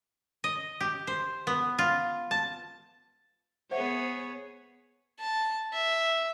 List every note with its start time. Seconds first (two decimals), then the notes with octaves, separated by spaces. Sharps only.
0.44 D#5
0.80 G4
1.07 C5
1.47 B3
1.78 F4
2.31 A5
3.71 B3 G#4 C5 C#5 E5 F#5
5.19 A5
5.73 E5